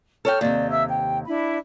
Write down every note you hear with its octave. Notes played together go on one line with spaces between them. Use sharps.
A4 C#5 G5 F6
D#2 C3 D5
E5 E6
G5
D4 E4 B5